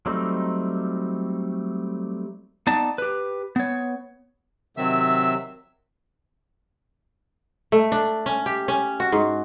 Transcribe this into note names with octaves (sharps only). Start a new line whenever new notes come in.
F#3 G3 A3 C4 D#4
B3 D#4 D5 A5
G4 B4
B3 C#5
C3 D#3 F#3 C4 E5 E6
A3
D4
C#4
G4
C#4
F#4
G#2